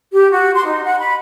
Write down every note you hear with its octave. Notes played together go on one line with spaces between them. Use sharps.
G4
F#4
C6
D#4
F#5
B5